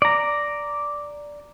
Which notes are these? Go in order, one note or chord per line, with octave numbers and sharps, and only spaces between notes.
D5 A#5